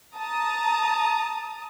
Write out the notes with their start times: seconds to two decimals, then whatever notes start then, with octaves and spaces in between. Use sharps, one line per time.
0.15 A5 A#5 D#6